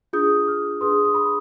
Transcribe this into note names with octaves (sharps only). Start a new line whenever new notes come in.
D4 F4 G#4 D#6 G6
D6 F6
D4 G#4 B4 C6 D#6
D#6
B5 D6